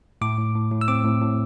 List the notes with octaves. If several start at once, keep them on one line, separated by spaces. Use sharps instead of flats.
A2 D6
A2
A2
A2
E6
C4 D6
A2
A2